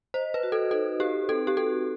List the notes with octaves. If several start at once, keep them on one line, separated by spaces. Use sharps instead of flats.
C5 D#5
B4
F#4
A4
D#4 A4
G4 B4
C4 A4
G4
F#4 A4